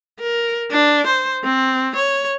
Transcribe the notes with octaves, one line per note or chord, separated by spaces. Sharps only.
A#4
D4
C5
C4
C#5